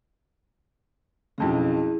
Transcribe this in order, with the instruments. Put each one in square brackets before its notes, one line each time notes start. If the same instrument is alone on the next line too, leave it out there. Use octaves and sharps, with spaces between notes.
[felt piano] B1 F2 C#3 [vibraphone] E4 G#4